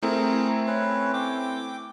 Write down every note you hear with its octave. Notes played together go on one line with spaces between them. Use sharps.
A3 C4 E4 G#4 A#4
C#4 B4 C#5
G5 D6